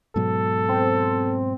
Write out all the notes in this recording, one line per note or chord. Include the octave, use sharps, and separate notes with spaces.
G#2 B2 F#3 A4
C4